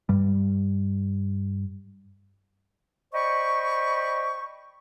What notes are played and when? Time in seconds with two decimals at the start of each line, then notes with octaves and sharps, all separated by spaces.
0.09 G2 G3
3.13 C5 D5 D#5 G5 B5 C#6